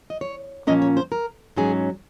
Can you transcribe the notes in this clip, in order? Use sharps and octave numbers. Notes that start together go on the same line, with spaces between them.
D#5
C#5
A#2 F3 A#3 C#4 D#5
C#5
C5
A#4
G#2 F#3 C#4 G#4